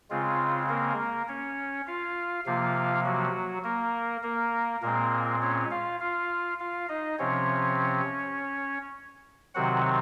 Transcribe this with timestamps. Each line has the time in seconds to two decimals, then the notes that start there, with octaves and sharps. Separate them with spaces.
0.10 C#3 G#3 C4 F4
0.69 A#3 A#4
1.28 C#4 C#5
1.87 F4 F5
2.46 C3 F3 A#3 F4 F5
3.05 F#3 F#4
3.64 A#3 A#4
4.23 A#3 A#4
4.82 A#2 G#3 A#3 C4 A#4
5.42 C#4 C#5
5.71 F4 F5
6.00 F4 F5
6.60 F4 F5
6.89 D#4 D#5
7.19 C3 F3 C4 C#4 C#5
9.54 C3 D#3 F#3 C4 F#4 F#5